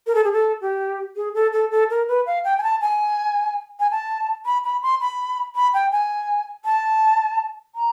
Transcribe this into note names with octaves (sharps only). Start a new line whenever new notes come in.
A#4
A4
G#4
A4
G4
G#4
A4
A4
A4
A#4
B4
F5
G5
G#5
A5
G#5
G#5
A5
B5
B5
C6
B5
B5
G5
G#5
A5
A#5